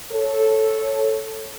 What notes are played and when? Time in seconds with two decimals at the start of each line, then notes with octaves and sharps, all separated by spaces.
0.11 A4 C#5